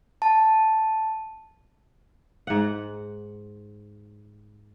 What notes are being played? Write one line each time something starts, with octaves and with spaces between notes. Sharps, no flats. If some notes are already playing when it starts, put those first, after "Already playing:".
A5
G#2 F#5